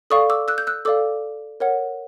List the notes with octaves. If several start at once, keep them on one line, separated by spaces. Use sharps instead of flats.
A4 D5 F5 C#6 D#6
D6 E6
E6 F#6
G6
E6 F#6
A4 D5 F5 D6 E6
A#4 C#5 F#5